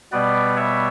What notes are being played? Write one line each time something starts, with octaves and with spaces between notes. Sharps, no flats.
B2 G3 B3 B4 D5
C#5 E5